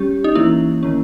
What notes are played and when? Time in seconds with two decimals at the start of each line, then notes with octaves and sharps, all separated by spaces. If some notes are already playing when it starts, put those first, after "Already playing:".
Already playing: G3 C#4 G4
0.24 D#4
0.35 E3 A#3 C#4 E4
0.83 D#3 A#3 C#4